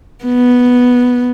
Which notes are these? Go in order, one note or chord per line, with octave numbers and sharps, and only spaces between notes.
B3